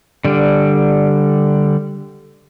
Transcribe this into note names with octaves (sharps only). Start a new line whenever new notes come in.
D3 G3